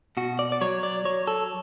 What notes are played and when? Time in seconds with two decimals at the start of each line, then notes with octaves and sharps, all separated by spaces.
0.17 B2 F#4
0.39 D5
0.52 D5
0.61 F#3 C#5
0.83 D5
1.05 F#3 C#5
1.27 A4